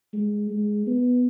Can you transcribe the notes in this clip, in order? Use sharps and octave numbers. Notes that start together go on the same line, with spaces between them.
G#3
G#3
B3